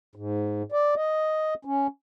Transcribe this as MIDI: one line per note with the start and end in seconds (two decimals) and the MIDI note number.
0.15 0.63 44
0.72 0.94 74
0.96 1.54 75
1.65 1.87 61